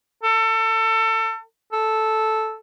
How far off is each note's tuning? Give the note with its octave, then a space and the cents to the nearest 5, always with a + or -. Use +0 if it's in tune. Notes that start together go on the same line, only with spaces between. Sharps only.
A4 +30
A4 -5